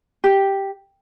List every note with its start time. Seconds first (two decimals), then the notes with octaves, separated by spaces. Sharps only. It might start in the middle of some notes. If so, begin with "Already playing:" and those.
0.24 G4